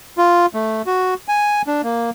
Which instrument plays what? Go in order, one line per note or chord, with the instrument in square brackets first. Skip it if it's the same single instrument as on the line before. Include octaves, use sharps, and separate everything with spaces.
[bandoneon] F4
A3
F#4
G#5
D4
A#3